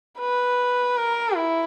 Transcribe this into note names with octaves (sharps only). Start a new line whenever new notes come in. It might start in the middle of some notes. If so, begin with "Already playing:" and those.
B4
A#4
E4